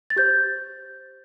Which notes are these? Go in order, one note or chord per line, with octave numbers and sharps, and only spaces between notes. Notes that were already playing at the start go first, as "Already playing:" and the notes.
A6
G4 C5 G6